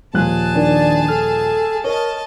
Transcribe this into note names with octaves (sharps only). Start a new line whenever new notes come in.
D#1 F3 G#4 A5 F#6
D#3 D4 D5
A4 F6
A#4 C#5 D#5 A5